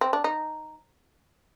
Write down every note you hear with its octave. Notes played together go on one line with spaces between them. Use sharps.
C4
D4
D#4